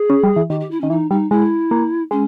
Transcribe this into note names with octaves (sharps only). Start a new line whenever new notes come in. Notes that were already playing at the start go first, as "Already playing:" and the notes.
Already playing: G#4
C#4
G3
E3
D#3 G4
G4
E4
D#3 C#4
E3 D#4
G3 D#4
G#3 E4
A#3
G#3 C#4